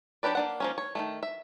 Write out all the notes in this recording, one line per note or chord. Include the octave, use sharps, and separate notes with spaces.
F#3 D4 G4 B4 D5
A#3 D4 F#5
F3 A#3 C#4
C#5
D#3 G#3 A3
E5